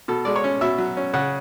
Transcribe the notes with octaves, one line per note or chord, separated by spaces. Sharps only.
B2 A4
G#3 D5
C#5
C#4
B2 E5
F#3
C#4
C#3 F#5